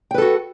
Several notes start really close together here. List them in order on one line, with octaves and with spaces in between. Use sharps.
G5 B4 A4 F#4